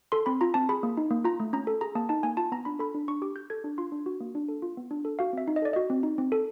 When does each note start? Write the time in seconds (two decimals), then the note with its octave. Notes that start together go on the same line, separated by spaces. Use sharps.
0.12 A4 C6
0.26 C4 B5
0.41 F4 A#5
0.54 C4 A5
0.69 G#4 B5
0.83 A#3
0.97 D#4
1.11 A#3
1.24 F4 A#5
1.40 A3
1.53 C#4 A#5
1.67 A4
1.81 G#4 A#5
1.95 A#3 A5
2.09 D#4 A5
2.23 A#3 G#5
2.37 F4 A5
2.52 B3 A#5
2.65 D4 B5
2.79 A4 B5
2.95 D4
3.08 D4 C#6
3.22 G4 D6
3.36 G4 G6
3.50 A4 G#6
3.64 D4
3.78 F4 C6
3.92 D4
4.06 F#4
4.20 A#3
4.35 D4
4.48 A4
4.62 F4
4.77 B3
4.91 D4
5.05 A4
5.19 F#4 F5
5.33 C4 E5
5.48 D#4
5.56 D#5
5.62 A4 D5
5.73 F#4 D#5
5.90 C4
6.03 D#4
6.18 C4
6.32 A4